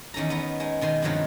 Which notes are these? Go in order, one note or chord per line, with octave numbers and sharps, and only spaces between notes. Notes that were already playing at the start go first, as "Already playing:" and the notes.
E2 D#3 C#4 A4 A#5
B3 D#4 A#5
G#3 D#4
B2 D#3 C6
G2 C3 D#3 F3 F#3 G#3